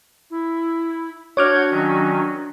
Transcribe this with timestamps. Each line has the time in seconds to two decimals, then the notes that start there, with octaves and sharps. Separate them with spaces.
0.31 E4
1.37 D4 F#4 C#5 F#5 D6 F6 G6 G#6
1.71 D#3 F#3 C#4